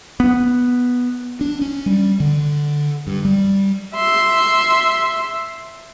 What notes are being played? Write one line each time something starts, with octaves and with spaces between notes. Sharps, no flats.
B3
D4
C#4
G3
D3
G2
G3
E5 C6